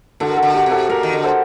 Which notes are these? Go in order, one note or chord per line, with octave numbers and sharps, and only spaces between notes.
D3 F#4 A4
A#4
F#4 A4
D3
G4
C3
F#4 A4
A#2 G4 A#4
D#3
D3
A4 C5